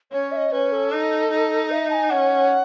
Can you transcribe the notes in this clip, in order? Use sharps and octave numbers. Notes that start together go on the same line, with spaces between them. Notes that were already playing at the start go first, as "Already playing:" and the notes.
C#4 C#5
E5
D#5
C#4 B4
A4
D#4
D#4
E5
A5
G#5
C#4 F#5